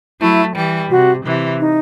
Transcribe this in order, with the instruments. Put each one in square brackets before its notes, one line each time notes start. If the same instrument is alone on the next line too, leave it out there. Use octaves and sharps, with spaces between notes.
[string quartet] F#3 A3 [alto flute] E4
[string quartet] E3 G3
[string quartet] C3 [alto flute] F#4
[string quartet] C3 E3
[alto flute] D#4